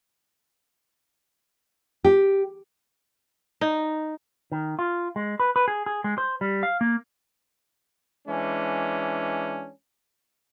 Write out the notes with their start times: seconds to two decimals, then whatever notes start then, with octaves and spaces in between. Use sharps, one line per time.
2.04 G4
3.61 D#4
4.52 D#3
4.79 F4
5.16 G#3
5.40 B4
5.56 B4
5.68 G#4
5.86 G#4
6.04 G#3
6.18 C5
6.41 G3
6.63 F5
6.81 A#3
8.28 E3 G#3 C#4 D4